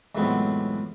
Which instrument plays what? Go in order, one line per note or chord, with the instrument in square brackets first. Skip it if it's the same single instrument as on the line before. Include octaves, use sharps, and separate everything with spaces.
[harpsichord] C#2 F#2 A2 E3 B3 C4